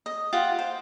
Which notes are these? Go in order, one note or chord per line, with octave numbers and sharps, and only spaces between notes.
D#5
F4 G4 F#5
C5